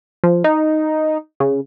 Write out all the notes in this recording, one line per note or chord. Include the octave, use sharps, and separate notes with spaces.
F3
D#4
C#3